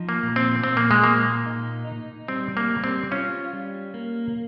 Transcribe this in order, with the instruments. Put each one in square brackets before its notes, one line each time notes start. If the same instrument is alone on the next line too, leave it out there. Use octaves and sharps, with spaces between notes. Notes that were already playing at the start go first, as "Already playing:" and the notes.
Already playing: [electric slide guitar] F3 D#4
[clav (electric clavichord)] A#3
[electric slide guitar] A#2
[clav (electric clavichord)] C4
[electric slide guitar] A#2 [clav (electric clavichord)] C4
[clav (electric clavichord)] A#3
G#3
[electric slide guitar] A#2 [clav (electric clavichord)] A#3
[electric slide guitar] D#4
D#4
[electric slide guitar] G3 [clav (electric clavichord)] C4
[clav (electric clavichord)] A#3
[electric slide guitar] G3
[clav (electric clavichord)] C4
[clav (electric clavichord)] C#4 [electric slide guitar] F4
[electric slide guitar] G3
A#3